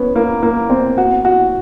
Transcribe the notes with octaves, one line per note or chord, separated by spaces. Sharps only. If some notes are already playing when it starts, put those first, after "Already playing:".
Already playing: B3 C#4
A#3
A#3
C4
F#4
F#4